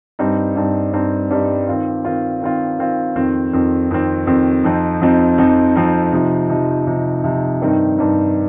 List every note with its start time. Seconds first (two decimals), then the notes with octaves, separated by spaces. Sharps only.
0.19 G2 G3 C4 D#4
0.56 G2 G3 C4 D#4
0.93 G2 G3 C4 D#4
1.31 G2 G3 C4 D#4
1.68 D#3 C4 F4
2.05 D#3 C4 F4
2.41 D#3 C4 F4
2.79 D#3 C4 F4
3.16 F2 D#3 C4
3.53 F2 D#3 C4
3.91 F2 D#3 C4
4.27 F2 D#3 C4
4.64 F2 F3 C4 D#4
5.01 F2 F3 C4 D#4
5.38 F2 F3 C4 D#4
5.76 F2 F3 C4 D#4
6.13 C3 F3 D#4
6.50 C3 F3 D#4
6.87 C3 F3 D#4
7.24 C3 F3 D#4
7.61 G2 D#3 C4 D#4
7.98 G2 D#3 C4 D#4